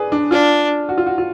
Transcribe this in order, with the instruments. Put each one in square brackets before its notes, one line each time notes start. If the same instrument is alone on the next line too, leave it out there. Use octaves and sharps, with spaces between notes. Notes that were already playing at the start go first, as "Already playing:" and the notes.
Already playing: [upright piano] G#4 B4 D5
D4
[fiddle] D4 [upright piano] F4
[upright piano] F#4
F4
F#4
F4